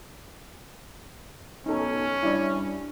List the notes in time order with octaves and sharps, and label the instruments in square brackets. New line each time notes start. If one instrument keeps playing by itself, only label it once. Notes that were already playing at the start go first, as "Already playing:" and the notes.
[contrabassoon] B1 [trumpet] C#4 [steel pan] D#4 A4
[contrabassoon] G2 [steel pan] E4 D5